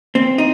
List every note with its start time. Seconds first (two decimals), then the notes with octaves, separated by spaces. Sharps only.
0.15 C4
0.38 D#4